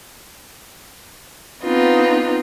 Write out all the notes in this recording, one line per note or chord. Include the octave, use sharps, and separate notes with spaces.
B3 C4 D4 D#4 F4 B4